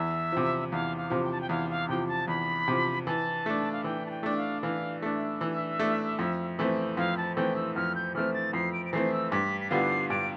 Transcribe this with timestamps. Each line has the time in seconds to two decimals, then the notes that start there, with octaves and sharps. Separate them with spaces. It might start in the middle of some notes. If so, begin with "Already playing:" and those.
Already playing: E2 E5
0.32 C3 F3
0.72 E2 F5
0.97 F5
1.10 C3 F3
1.24 G5
1.32 A5
1.41 G5
1.49 E2 F5
1.70 F5
1.89 C3 F3 G5
2.08 A5
2.28 E2 B5
2.68 C3 F3
3.06 E3 A5
3.46 A3 D4
3.72 F5
3.84 E3 G5
4.06 A5
4.10 G5
4.23 A3 D4
4.37 F5
4.62 E3 F5
5.02 A3 D4 E5
5.41 E3
5.79 A3 D4
6.19 F2
6.59 E3 A3 C4
6.97 F2 F5
7.17 A5
7.36 E3 A3 C4 G5
7.56 E6
7.75 F2 F6
7.96 G6
8.15 E3 A3 C4 F6
8.34 A6
8.53 F2 C7
8.73 D7
8.86 D7
8.93 E3 A3 C4 C7
9.13 E6
9.32 G2 B6
9.61 B6
9.71 D3 G3 B3 F4 C7
10.10 G2 D7